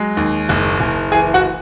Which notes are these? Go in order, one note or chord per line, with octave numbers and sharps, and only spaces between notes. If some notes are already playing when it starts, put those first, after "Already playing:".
Already playing: F#3 G#3
D#2
F#1
F#1
E3 G#4 G#5
F#4 F#5